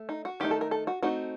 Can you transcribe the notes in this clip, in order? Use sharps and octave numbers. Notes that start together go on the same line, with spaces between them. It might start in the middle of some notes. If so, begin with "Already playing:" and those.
Already playing: A3
D#4
F#4
D#3 A3 D#4 G4
A4
A#4
A4
F#4
A3 C4 D#4 F#4